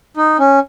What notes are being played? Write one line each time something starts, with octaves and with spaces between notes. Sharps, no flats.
D#4
C#4